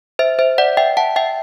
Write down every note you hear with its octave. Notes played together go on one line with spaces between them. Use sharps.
C5 E5
C5 E5
D5 F#5
E5 G5
F#5 A5
E5 G5